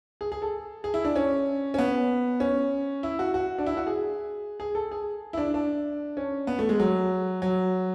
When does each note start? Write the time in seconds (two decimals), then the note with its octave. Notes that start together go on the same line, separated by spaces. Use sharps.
0.21 G#4
0.32 G#4
0.42 A4
0.84 G#4
0.94 E4
1.05 D4
1.16 C#4
1.74 C#4
1.78 B3
2.40 C#4
3.03 E4
3.19 F#4
3.34 F#4
3.58 D4
3.66 E4
3.77 F#4
3.87 G#4
4.60 G#4
4.75 A4
4.91 G#4
5.33 E4
5.37 D4
5.54 D4
6.17 C#4
6.47 B3
6.59 A3
6.69 G#3
6.80 F#3
7.42 F#3